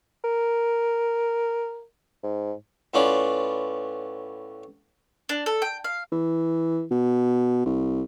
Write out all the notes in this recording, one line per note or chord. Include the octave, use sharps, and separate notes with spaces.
A#4
G#2
A2 B3 C#4 F4 D5
D4
A4
G5
F5
E3
B2
C2